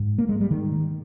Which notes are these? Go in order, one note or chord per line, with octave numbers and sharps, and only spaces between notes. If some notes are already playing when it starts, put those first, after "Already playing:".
Already playing: G#2
A#3
G#3
G3
D#3